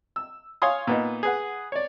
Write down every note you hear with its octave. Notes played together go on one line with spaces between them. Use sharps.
E6
C#5 F5 G#5 C6 D#6
A#2 B3 D#4
G#4 B4 F#5
C#5 D5